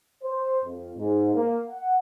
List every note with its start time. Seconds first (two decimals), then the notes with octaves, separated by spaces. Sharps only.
0.23 C5
0.65 F2
0.98 G#2
1.35 A#3
1.70 F#5